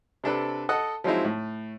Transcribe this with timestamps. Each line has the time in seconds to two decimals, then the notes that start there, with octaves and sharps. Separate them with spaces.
0.24 C3 D4 A4 B4
0.69 A4 D#5 F#5
1.04 F3 F#3 G#3 C4 D#4 E4
1.25 A2